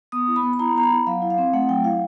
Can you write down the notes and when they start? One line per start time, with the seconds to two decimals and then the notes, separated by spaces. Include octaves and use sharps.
0.12 B3 D#6
0.28 E4
0.36 B5
0.43 B3
0.53 B5
0.59 E4 A#5
0.75 B3 A#5
0.83 B5
0.91 E4
1.07 F#3 F5
1.22 E4
1.30 F5
1.38 C4
1.53 A3 F#5
1.69 F#3 G5
1.84 E4 F5